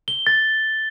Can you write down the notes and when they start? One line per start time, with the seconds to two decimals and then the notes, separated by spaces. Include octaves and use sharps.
0.08 G7
0.27 A6